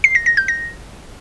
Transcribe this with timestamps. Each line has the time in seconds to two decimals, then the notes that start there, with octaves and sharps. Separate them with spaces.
0.04 C7
0.15 A#6
0.26 A#6
0.37 G6
0.48 A#6